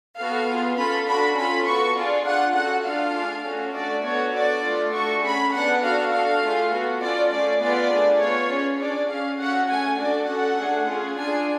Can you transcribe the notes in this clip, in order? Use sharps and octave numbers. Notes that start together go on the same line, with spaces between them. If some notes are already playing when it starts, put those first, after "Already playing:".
B3 F#4 A4 F5
B3 F4 G#4
C#4 F4 A4 B5
D4 F#4 A4 B5
C#4 F4 A4 B5
B3 F#4 A4 C#6
D4 F4 G#4 D5
D4 F4 G#4 F#5
C#4 F#4 A4 F#5
A3 D4 F4 A4 F5
D4 G#4
A3 C#4 F#4 A4
A3 D4 F#4 A4 D5
B3 F#4 A4 C#5
D4 F#4 A4 D5
A3 F4 A4
A3 D4 F#4 A4 C#6
C#4 G#4 B5
B3 D4 G#4 F#5
D4 F#4 A4 F5
D4 F#4 A4 F5
A3 F4 G#4
B3 F#4 A4
C#4 F4 A4 D5
A3 C#4 G#4 D5
B3 F4 G#4 D5
A3 D4 G#4
B3 F4 G#4 C#5
C#4 G#4
D4 G#4 D5
C#4 G#4 F5
C#4 F#4 A4 F#5
A3 C#4 G#4 G#5
D4 F#4 A4 D5
C#4 F#4 A4 F#5
A3 D4 G#4
C#4 F4 G#4
D4 F4 G#4 G#5